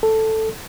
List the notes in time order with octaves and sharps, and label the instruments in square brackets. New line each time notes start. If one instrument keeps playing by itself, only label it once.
[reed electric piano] A4